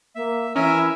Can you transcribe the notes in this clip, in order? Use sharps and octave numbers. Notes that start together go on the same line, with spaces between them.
A#3 E5
E3 C#4 A#4 E5 G#5 A#5